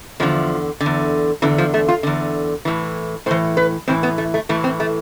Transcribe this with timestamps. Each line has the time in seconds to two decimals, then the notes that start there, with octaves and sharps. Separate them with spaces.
0.20 E2 D3 F3
0.81 D3
0.86 E2
1.42 E2 D3 E3
1.58 F3
1.74 A3
1.88 F4
2.03 E2 D3
2.65 A2 E3
3.26 A2 E3 C5
3.57 B4
3.88 A2 E3 C4
4.03 B3
4.18 A3
4.34 A3
4.49 A2 E3 A3
4.64 C4
4.80 A3